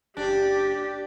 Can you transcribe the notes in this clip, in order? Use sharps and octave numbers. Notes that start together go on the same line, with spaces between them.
F#1 D4 G4